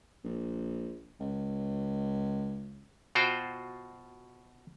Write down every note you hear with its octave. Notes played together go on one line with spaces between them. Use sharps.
A#1
C#2
B2 F4 F#4 C5 G5